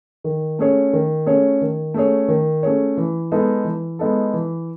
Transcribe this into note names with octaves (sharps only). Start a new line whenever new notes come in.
D#3
A3 C#4 G#4 C#5
D#3
A3 C#4 G#4 C#5
D#3
A3 C#4 G#4 C#5
D#3
A3 C#4 G#4 C#5
E3
G#3 B3 D#4 A4
E3
G#3 B3 D#4 A4
E3